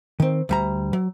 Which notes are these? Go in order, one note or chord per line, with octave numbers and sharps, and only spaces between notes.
D#3 C4
D2 G3 A#5
F#3